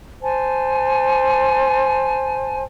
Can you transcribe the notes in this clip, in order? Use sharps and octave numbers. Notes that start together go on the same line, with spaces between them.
C5 G#5 A5